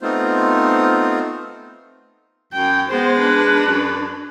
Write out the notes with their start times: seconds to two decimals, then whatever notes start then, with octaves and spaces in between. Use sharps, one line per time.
0.01 A3 B3 C4 D#4 F4 C5
2.53 F#2 G5
2.89 G#3 B3 C5
3.19 D4 B4
3.67 F#2